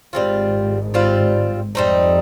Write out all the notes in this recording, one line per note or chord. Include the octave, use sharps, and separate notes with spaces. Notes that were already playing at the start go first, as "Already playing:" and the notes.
G#1 G#2 G3 C4 F4
G3 C4 F4
F2 G3 C4 D#4